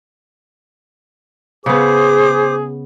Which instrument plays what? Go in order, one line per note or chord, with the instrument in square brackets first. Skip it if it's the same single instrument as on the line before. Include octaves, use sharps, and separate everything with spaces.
[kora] C#3 B3 [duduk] G#4 [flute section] C5 D6 D#6